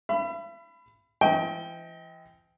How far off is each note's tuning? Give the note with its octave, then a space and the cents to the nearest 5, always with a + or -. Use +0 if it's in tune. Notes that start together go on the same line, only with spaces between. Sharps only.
E5 +45 B5 +15
E3 +45 D#5 +40 G5 +0